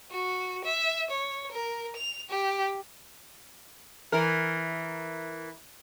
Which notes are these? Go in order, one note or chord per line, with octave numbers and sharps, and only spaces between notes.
F#4
E5
C#5
A#4
F7
G4
E3 A#4